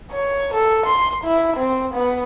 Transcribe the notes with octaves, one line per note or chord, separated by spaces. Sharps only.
C#5
A4
C6
E4
C4
B3